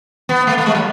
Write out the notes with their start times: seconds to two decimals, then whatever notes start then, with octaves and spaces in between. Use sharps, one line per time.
0.29 B3
0.47 A3
0.58 A3
0.66 G#3
0.75 F#3